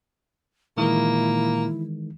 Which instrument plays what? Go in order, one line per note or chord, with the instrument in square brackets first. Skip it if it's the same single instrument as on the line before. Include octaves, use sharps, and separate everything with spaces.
[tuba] A#2 [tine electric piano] D#3 E3 G#3 [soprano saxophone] A#3 [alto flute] E4